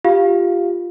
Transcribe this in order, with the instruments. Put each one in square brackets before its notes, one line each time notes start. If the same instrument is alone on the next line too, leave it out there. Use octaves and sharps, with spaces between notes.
[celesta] F4 G4 F5